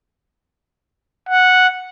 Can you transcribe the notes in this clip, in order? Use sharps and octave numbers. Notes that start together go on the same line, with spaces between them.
F#5